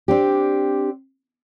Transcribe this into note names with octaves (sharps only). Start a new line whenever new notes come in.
C4 D4 G4